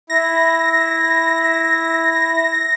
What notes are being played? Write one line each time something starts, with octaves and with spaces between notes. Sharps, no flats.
E4 A#6